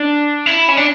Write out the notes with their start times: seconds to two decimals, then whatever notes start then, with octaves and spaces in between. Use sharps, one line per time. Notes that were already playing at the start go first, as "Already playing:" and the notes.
Already playing: D4
0.46 E4
0.68 C#4
0.77 D4